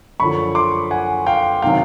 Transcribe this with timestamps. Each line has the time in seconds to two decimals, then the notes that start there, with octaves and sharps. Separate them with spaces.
0.20 F#2 D3 F3 B5 C#6
0.55 C6 D6
0.91 F#5 G#5
1.27 F5 G5
1.62 C3 D#3 F#3 F5 G5